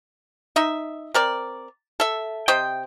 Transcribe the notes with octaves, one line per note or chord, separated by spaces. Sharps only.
D#4 D#5 E5
C4 A#4 D5
A4 E5
C3 C5 D#5 G5